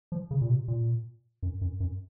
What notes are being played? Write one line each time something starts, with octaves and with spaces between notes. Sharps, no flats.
F3
C#3
A#2
C3
A#2
F#2
F#2
F#2